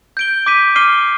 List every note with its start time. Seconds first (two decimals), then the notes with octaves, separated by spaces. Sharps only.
0.17 G6 D7 G7
0.46 D6 G6 B6 D#7
0.76 D6 F6 C7 D#7 G7